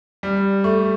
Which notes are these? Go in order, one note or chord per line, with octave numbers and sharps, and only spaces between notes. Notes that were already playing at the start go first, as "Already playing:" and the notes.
G3
A3